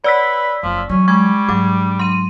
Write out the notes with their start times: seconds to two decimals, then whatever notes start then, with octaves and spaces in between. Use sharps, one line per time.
0.04 B4 C#5 D5 F#5 B5 E6 B6
0.63 F#1 F2 F3
0.89 E3 F#3 C#4
1.08 G3 G#3 C#6 G#6
1.48 G#2 F#3 D4 D6
1.99 F#3 C6 D#7